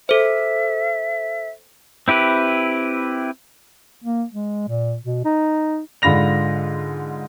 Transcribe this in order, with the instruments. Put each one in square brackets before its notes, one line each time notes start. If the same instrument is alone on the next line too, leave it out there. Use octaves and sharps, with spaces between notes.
[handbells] A4 C5 [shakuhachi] E5
[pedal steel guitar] C4 E4 G4 B4
[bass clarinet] A#3
G#3
A#2
B2
D#4
[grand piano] G#2 D3 F4 B5 A#6 F7